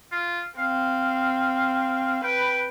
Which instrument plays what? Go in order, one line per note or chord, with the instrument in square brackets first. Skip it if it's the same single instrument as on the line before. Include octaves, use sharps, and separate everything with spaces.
[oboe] F4
[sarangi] C4 [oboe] F5
[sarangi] B4 [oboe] G5